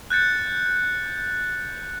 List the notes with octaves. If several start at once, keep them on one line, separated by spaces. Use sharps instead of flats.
F#6 G6 A6 C#7